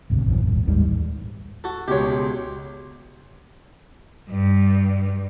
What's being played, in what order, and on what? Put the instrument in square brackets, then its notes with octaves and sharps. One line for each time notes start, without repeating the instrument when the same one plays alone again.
[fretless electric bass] G#1 D2 C3
A#1 F#2 E3
D#1 G#1
A1 D#2 G#2 G3
[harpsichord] F#4 A4
[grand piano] C#2 B2 [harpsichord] G4 C#5
[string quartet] G2